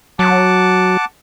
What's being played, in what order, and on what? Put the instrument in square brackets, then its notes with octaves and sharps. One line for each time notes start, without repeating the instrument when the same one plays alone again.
[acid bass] F#3 [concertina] F#5 A5 D6